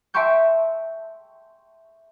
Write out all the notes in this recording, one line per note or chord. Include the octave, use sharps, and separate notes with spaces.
E5 G5 A5 C6 C#6 G6